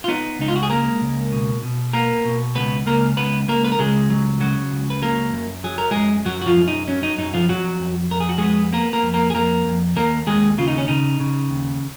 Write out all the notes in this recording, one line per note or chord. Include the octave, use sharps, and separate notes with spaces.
F4
B3 D#4
C#2 D#4
F4
F#4
G#4
G#3 A#3 A#4
C#2
B2
B2
A#3 B3 A#4
B2
C#2 B3 B4
C#2 A#3 A#4
C#2 B3 B4
C#2 A#3 A#4
B4
A#4
C#2 G#3 G#4
F#3
C#3 F#3 F#4
C#2
B4
F#3 A#3 A#4
F#2
F#3 G#4
A#4
F#2 G#3 G#4
F#2 F#3 F#4
F#4
F3 F4
F#2
D#4
F#3 C#4
D#4
F#2 D#4
F3 F4
F2 F#3 F#4
F2
F2 A#4
G#4
F#4
G#3 B3 G#4
A#3 B3 A#4
A#3 A#4
F2
A#3 A#4
G#4
F2 A#3 A#4
F2
D#2 A#3 A#4
D#2 G#3 G#4
C#3 F4
D#4
C#4
C#3 D#4
C#3
D#2